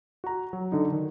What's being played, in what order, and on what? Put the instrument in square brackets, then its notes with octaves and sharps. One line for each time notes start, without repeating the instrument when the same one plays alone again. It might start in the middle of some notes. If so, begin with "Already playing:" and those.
[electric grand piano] F#4 A#5
F#3
D3 D#4
D#3